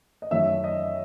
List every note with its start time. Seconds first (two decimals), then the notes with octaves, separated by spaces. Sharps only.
0.22 D#5
0.31 F#2 D#3 A3 C#4 E5
0.64 D#5